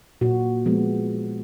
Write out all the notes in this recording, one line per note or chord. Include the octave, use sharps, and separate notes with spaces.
A#2 F#4
F3 G#3 B3